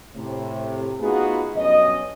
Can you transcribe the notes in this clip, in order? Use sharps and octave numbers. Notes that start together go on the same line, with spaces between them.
A2 C3
A3 B3 D#4 F4 F#4 G#4
B1 G2 C#4 D#5